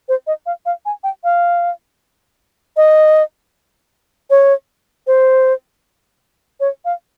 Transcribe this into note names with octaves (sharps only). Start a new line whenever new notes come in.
C5
D#5
F5
F5
G#5
G5
F5
D#5
C#5
C5
C#5
F5